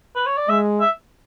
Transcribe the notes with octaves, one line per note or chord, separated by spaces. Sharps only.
B4
C#5
D5
G#3 E5
E5